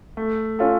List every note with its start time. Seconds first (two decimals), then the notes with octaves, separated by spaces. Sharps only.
0.17 A3
0.59 C#4 F4 A4